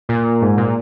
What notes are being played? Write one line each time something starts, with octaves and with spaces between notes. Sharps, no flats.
A#2
G#2
A#2